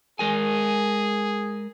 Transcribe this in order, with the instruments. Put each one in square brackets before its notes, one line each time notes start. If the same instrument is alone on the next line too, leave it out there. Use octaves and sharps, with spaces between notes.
[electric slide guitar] G#3 A#4 G#5 [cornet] G#4